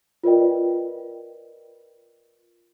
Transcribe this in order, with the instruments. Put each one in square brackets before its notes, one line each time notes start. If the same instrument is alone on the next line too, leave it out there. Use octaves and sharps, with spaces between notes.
[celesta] F4 A#4 B4 D5 D#5 G5